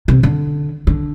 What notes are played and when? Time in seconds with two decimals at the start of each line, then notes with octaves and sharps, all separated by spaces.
0.08 C3
0.23 D3
0.87 D3